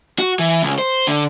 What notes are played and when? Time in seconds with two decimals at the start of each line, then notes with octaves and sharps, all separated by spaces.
0.19 F#4
0.39 E3
0.62 C#2
0.78 C5
1.07 D3